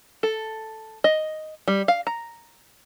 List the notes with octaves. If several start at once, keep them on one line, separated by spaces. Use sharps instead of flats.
A4
D#5
G3
F5
A#5